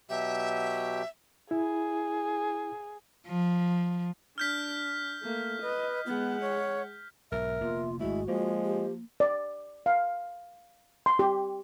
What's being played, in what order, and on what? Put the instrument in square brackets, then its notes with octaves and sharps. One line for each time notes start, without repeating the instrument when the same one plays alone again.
[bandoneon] B2 F#3 G4 [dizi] E5
[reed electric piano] E4 [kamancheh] G#4
[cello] F3
[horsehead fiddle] D4 [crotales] F6 G6 B6
[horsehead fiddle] A3 A#3
[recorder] B4 [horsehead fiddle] D#5
[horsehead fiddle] G#3 F#5 [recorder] B3
[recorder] C#5
[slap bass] B1 G#2 [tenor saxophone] A#4 [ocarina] E5
[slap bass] F1 A#3 B3 [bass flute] F4
[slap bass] G#1 A3 [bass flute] G#3 [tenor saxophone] E4 [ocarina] F#4
[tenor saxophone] F3 [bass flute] G#3 [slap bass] A#3
[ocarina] G4
[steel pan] D5
F5
C6
G4